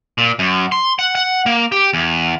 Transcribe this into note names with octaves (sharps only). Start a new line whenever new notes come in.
A#2
F#2
C6
F#5
F#5
A#3
G4
E2